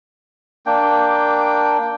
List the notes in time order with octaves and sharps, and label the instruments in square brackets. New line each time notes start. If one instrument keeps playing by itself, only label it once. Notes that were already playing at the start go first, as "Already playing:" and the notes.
[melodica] A#3 D4 G5